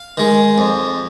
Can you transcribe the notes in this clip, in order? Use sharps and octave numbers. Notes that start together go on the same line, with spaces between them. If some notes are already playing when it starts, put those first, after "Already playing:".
Already playing: F5
D#3 G#3
F2